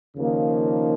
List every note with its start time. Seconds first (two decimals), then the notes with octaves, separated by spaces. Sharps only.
0.17 D#2 C#3 F3 A#3 D#4